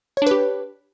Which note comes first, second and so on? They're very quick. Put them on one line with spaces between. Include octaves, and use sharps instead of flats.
C#5 D4 B4 G4